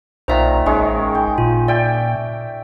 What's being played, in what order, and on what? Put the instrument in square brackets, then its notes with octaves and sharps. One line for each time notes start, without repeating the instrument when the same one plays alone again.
[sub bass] B1 [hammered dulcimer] A#2 D#3 A#4 [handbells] C5 E5 A#5
[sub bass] A1 [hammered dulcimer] D#3 G#3 C#4
[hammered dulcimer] G5
[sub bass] A#2 [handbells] F4
[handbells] D5 [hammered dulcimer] E5 G5